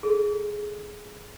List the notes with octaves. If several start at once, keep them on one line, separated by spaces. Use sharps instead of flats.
G#4 A4